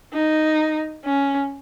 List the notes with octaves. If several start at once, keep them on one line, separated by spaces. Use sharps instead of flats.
D#4
C#4